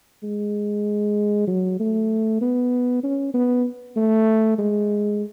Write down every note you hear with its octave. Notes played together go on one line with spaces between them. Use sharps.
G#3
F#3
A3
B3
C#4
B3
A3
G#3